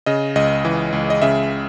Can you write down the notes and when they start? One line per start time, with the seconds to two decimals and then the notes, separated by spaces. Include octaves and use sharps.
0.06 C#3 D#5
0.35 C#2 D#5
0.65 E3
0.92 C#2
1.10 D#5
1.22 C#3 E5